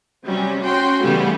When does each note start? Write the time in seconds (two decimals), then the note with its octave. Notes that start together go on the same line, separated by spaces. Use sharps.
0.25 C3 F#3 G3 C#4
0.62 C#4 F#4 G5 C6
1.03 C#3 E3 G3 A3 B3 C#4